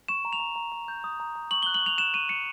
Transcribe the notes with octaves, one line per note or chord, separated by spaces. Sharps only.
C#6 E7
A#5
F7
A#5
A#5
A#5
G6
D#6
A#5
A#5
C#6 F#7
F#6 G7
F#7
C#6 F7
F#6 E7
C#6 D#7
F#6 C#7